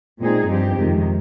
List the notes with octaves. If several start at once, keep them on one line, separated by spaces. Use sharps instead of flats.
A#2 G#3 C4 D#4 G#4
G2 F3 C4 G4
F2 C3 D#3 G#3